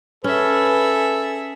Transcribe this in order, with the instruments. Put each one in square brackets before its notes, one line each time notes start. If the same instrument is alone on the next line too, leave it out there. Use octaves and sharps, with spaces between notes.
[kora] C#4 [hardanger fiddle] G#4 E5 [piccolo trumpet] A4 [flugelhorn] B4